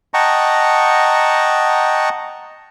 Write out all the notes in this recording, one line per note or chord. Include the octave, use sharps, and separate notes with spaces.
D#5 F#5 G5 A5 A#5 C#6